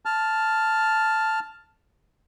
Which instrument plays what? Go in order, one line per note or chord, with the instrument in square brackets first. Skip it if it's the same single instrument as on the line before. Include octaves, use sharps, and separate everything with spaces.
[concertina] A5 F6